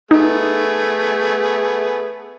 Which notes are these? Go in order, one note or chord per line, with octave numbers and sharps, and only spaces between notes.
A3 B3 D#4 G#4